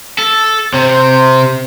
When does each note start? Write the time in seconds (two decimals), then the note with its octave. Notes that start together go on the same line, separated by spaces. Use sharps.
0.18 A4
0.74 C3 C5